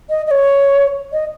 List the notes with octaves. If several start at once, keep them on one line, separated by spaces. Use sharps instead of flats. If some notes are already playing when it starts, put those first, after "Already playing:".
D#5
D#5
C#5
D#5